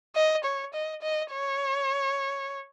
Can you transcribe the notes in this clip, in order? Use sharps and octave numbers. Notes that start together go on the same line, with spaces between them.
D#5
C#5
D#5
D#5
C#5